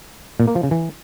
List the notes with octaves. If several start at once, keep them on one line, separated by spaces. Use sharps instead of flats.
A#2
A#3
F3
C#3
E3